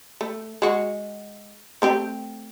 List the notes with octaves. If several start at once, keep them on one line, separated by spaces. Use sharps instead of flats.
A3
G#3 F#4
A3 C4 G4